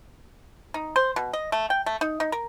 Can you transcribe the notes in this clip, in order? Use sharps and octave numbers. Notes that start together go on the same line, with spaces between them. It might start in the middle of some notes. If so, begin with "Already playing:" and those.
D#4
C5
B2
D#5
A3
G5
A3
D#4
D#4
A#4